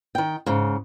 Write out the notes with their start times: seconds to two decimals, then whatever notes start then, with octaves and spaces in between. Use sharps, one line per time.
0.15 D#3 G5
0.46 G#2 C#3